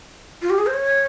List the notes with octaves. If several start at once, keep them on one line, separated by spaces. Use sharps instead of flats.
F4
G4
G#4
C5
C#5